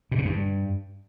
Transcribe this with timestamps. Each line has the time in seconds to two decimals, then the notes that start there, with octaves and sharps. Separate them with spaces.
0.11 B2
0.18 C#3
0.25 G2